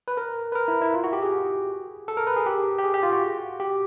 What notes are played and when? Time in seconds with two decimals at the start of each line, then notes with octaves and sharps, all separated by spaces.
0.08 B4
0.17 A#4
0.52 B4
0.55 A#4
0.68 E4
0.81 E4
0.94 F4
1.04 F#4
1.13 G4
1.22 G#4
2.08 A4
2.17 A#4
2.27 B4
2.36 G#4
2.46 G4
2.78 G4
2.84 G#4
2.94 G4
3.03 F4
3.13 F#4
3.60 G4